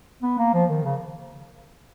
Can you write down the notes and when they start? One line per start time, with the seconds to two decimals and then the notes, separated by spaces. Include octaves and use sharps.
0.23 B3
0.38 A#3
0.54 F3
0.70 D#3
0.84 C#3